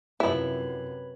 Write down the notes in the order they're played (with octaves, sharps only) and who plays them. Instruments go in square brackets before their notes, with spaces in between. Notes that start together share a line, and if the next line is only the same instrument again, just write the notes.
[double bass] F#2 C3 [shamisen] F3 E4 [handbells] B4 C#5 B5